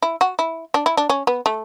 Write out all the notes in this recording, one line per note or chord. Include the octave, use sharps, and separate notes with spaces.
E4
F#4
E4
D4
E4
D4
C#4
B3
A3